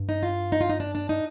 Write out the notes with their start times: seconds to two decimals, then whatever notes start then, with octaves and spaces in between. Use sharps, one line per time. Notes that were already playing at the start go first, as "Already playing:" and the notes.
Already playing: G2
0.09 D#4
0.23 F4
0.52 D#4
0.61 F4
0.70 D#4
0.80 D4
0.95 D4
1.09 D#4